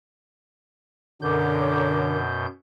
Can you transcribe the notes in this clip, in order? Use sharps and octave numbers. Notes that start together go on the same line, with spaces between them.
F#2 B2 D3 A#4 C#5 D6 G6